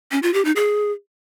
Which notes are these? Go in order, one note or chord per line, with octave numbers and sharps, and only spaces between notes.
C#4
F4
G4
D#4
G#4